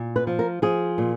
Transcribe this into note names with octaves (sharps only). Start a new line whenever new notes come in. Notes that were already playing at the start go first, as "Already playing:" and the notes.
Already playing: A#2
B4
F3
A#4
F3 G#4
A#2